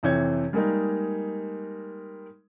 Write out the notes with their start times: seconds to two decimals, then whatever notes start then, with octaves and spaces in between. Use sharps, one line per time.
0.03 F2 C3 E3 C#5 G6 G#6
0.53 G3 G#3 A#3 D#4